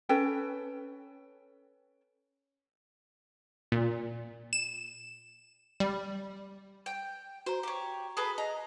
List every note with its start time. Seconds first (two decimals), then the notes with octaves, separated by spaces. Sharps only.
0.09 C#4 A4 B4 G5
3.72 A#2
4.53 E7
5.80 G3
6.86 G5
7.46 F#4 C5 A#5
7.63 G4 C#5
8.17 G#4 A4 B4
8.38 D#5 A#5